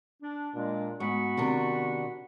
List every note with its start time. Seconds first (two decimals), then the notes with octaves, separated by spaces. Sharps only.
0.22 D4
0.55 A#2 G#3 D4
1.00 G#2 B3 F#4 B5 C#6
1.37 C3 D#3 D4